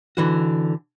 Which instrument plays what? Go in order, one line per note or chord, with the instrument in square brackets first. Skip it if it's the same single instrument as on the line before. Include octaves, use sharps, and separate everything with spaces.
[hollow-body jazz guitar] D3 E3 F#4